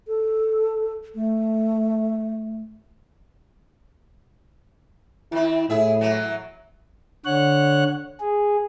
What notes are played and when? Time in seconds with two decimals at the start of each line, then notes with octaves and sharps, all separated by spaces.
0.08 A4
1.15 A3
5.32 D#3 C4 E4
5.70 A2 E4 G#4 E5
6.01 E3 F#3
7.25 D3 C#5 F#5 F#6
8.20 G#4